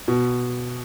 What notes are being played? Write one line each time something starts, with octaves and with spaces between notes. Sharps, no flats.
B2